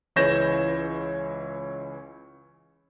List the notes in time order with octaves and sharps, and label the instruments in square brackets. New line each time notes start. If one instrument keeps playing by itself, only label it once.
[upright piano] C#2 E3 C#5 G6 A#6 E7